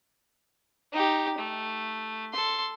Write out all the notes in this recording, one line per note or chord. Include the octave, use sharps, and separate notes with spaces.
D#4 G4
A3
A4 C6